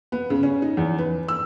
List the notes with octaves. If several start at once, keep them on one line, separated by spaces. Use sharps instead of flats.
B3
C#3
C#4
D#4
E2
B4
E6